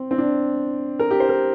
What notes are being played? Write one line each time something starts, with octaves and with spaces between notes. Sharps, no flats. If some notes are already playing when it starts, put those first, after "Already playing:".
Already playing: C4
C4
D4
A#4
G4
C5
A#4